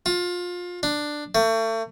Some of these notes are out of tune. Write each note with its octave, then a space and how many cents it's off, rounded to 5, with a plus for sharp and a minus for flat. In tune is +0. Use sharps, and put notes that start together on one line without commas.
F4 +25
D4 +10
A3 +35